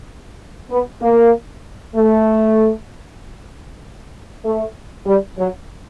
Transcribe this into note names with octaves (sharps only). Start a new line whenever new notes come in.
B3
A#3
A3
A3
G3
F#3